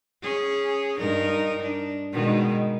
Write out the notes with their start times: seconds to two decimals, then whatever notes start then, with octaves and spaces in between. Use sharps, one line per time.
0.23 C#4 G#4
0.97 G2 D#4 A#4
1.60 D4
2.12 B2 D#3 G#3